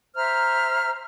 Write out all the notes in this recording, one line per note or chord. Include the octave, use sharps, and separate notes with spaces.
C5 E5 A#5 F6